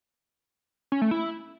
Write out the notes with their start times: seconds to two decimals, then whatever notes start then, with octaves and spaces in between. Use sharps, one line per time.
0.92 C#4
1.02 A3
1.11 E4